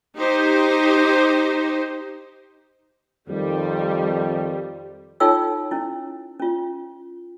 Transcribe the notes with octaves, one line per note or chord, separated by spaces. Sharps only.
D#4 G4 C5
F2 D#3 G3
D#4 F4 A4 C#5 G5 E6
C#4 E4
C#4 F4